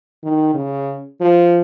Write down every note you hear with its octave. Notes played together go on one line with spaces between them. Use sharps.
D#3
C#3
F3